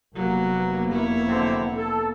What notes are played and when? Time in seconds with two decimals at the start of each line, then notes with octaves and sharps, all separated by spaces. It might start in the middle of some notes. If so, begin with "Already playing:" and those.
0.15 F1 F#3 A#3 B3
0.92 E4 C#5
1.28 F#2 D3 C4
1.77 A4